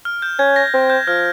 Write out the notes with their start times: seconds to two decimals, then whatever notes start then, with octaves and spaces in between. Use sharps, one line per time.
0.05 F6
0.22 G6
0.39 C#4 G#6
0.56 A#6
0.74 C4
0.90 G6
1.07 F3 F6